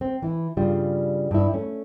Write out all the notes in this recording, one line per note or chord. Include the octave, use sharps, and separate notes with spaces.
C4
E3 E4
G2 C#3 G3 F4
G2 E4
A3 C#4